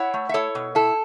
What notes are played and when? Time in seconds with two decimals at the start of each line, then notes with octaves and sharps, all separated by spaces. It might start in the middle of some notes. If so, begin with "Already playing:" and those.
Already playing: E4 C#5 F#5
0.14 A3
0.29 E5
0.34 E4 A4 C#5
0.55 B2
0.75 E4 A4